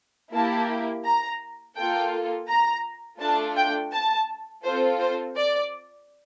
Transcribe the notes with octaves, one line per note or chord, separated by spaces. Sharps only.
A#3 E4 G4 A5
A#5
A#3 F4 A4 G5
A#5
A3 D4 F4 A4 A5
G5
A5
C4 F4 A4 C5
C5
D5